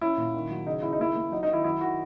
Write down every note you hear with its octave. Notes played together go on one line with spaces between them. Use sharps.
C#4 E4
A#2
D#3
F#3
C#3 D#4
C#3 E4
D#4
A#3 E4
A#3
F#3 D#4
D#3 D#4
E4
F#3 E4
D#3 F#4